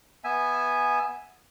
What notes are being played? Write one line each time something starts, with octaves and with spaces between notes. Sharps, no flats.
B3 E5 G#5